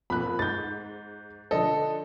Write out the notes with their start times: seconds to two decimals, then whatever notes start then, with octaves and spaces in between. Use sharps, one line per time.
0.10 F2 A#2 B5 F#6
0.39 G#2 G6 A6
1.51 D3 F3 D4 A4 D#5